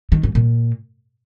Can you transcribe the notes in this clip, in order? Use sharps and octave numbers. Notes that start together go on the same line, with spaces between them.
D#3
G#2
A#2